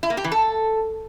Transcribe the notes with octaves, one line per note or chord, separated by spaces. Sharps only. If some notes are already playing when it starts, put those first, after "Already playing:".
E4
A#3
G4
E3
A4